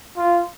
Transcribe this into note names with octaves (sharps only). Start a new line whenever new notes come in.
F4